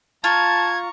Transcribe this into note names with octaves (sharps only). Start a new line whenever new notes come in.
F4 A5 A#5 C#6 G#6